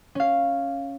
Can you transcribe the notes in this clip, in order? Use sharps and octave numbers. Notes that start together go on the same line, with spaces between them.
C#4 F5